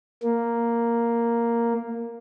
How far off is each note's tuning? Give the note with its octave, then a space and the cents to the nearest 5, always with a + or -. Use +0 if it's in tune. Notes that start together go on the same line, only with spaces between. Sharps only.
A#3 +0